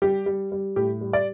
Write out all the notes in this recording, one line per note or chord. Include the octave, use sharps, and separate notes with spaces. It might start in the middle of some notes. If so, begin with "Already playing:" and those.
G3 G4
G3
G3
A2 G4
G3
D5